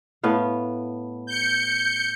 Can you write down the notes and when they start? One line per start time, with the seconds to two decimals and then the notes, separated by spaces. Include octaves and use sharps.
0.23 A2 B3 F5
1.27 G6 C#7